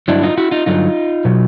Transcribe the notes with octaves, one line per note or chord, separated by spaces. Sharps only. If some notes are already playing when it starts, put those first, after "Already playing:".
G2 D3 F#3 D4 E4
D#4 F4
E4 F#4
D#4 F4
G2 D3 F#3 D#4 F4
B2 F#3